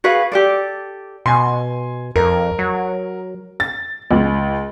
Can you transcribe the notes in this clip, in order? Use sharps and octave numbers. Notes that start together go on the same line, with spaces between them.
F#4 G#4 B4 F5
G4 A4 D5
B2 G#5 C6
F2 A#4
F#3
A6
C#2